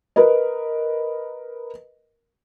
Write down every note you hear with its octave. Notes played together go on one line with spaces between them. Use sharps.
A#4 B4 D#5